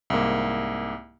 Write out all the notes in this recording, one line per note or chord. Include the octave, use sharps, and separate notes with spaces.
C2 G#2 A#3